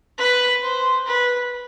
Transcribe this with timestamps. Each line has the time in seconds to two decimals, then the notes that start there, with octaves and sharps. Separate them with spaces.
0.18 B4
0.62 C5
1.06 B4